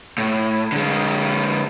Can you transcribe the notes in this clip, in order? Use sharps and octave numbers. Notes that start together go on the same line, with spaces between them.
A2
D3 G#3